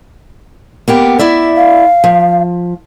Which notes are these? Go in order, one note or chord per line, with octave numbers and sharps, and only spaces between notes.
A#3 B3 G4
E4 D5 E5
F5
F3